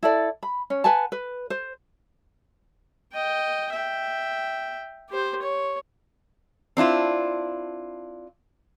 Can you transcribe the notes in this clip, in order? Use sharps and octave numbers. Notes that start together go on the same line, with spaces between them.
E4 A4 D5
B5
C#4
B4 F#5 G#5 A5
B4
C5
D#5 G5
E5 G5
G4 C5
C#5
C4 D4 E4 F4